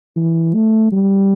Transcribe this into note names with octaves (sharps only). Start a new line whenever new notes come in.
E3
A3
G3